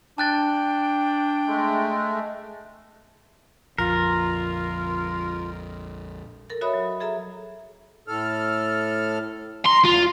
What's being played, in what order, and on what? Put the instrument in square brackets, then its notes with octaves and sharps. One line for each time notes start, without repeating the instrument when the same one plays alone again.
[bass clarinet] D4 [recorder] G5 [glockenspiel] A5 F#6 A6
[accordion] G#3 A3
[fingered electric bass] A#1 F2 [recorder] F4 [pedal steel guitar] A#4
[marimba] A4 A#4 A6
F#4 C#5 D#5 E5 B5 D#6
F#3
G#4 A4 E5 A#5
[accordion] A2 A4 F6
[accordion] A#5 [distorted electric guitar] C6
[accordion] E2 [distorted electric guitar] F4